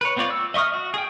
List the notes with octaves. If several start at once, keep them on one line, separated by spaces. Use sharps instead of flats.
B4 C#5
B3 C4 F4 C#5 D5
E6
D#5 E5 C#6 D#6 F6
F#4
G#4 G5